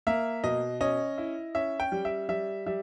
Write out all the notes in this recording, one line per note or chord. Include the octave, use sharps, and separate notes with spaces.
A#3 E5
B2 D#5
C#4 D#5
E4
C#4 E5
G5
G3
E5
G3 E5
G3 E5